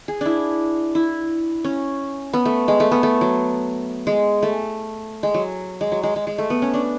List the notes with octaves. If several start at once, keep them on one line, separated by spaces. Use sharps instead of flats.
G#4
D4 E4
E4
C#4
B3
A3
G#3
A3
B3
A3
F#3
G#3
A3
G#3
F#3
G#3
F#3
G#3
G#3
G#3
A3
B3
C#4
D4